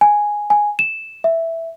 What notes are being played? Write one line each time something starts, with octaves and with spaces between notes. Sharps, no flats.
G#5
G#5
E7
E5